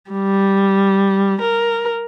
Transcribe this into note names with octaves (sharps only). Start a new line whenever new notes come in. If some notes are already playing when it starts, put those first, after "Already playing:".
G3
A#4